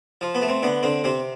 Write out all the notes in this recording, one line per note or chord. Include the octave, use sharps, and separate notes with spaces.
F3
B3
A3
C4
D3 B3
D3 C4
C3 C4